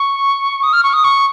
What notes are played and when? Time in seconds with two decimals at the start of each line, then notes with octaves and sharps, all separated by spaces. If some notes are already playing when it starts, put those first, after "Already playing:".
Already playing: C#6
0.63 D#6
0.73 F6
0.83 C#6
0.93 D#6
1.04 C#6